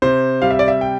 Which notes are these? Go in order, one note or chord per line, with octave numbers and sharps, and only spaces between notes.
C3 C5
G3 F5
E5
D5
E5
G5